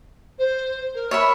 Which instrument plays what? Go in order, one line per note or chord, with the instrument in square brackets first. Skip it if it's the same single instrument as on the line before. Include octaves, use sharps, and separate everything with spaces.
[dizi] C5
A#4
[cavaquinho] C#5 E5 B5